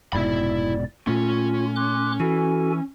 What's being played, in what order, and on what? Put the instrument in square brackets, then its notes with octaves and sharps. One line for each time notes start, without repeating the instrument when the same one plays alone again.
[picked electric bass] F1 G#2 B2 [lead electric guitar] E4 B5 [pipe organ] D5
[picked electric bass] A#2 A3 [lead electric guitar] C#4 [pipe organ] F4
[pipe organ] C6 D6 F#6
[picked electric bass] E3 [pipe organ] F#4 A4 G#5